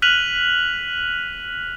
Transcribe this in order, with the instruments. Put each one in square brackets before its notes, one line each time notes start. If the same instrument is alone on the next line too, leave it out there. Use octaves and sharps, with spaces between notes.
[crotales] F6 F#6 B6 D#7 F7 F#7